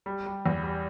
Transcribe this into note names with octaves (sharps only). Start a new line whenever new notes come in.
G3
G3
E2
G3